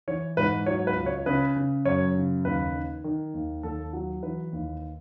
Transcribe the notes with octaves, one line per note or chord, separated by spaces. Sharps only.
E3 C#5
G#2 B4
F#3 C#5
B4
C#2
C#5
C#3 B4
C#3
F#2 C#5
C#3
D#2 B4
D#3
D#3
D#2
D#2 A4
F#3
E3 B4
D#2